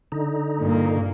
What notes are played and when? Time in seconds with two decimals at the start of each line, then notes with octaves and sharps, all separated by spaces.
0.12 D3 D#4
0.61 G2 A#2 A#3